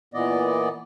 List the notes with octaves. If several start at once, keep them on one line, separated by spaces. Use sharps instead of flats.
A#2 E3 B3 D5 D#5